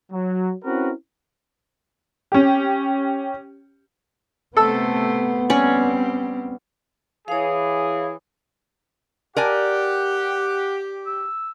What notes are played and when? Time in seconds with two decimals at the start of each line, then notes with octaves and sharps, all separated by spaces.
0.12 F#3
0.64 C4 C#4 E4 F#4 A#4 B4
2.32 C#4 G4
4.57 C3 A3 B3 A4 C5 E6
5.50 G3 C4 C#4 D5
7.28 E3 G#4 C#5 F5
9.36 G4 A#4 D5 F#5 G#5
11.06 E6